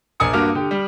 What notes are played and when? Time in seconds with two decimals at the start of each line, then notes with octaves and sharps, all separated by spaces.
0.20 A#1 D4 A#4 G#5 D#6 C#7
0.33 G2 A#3 F#4 D6 F6
0.55 D3 G4
0.71 G3